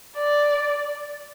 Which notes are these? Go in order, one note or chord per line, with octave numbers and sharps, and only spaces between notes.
D5